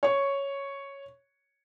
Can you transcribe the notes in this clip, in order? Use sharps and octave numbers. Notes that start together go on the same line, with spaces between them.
C#5 C#6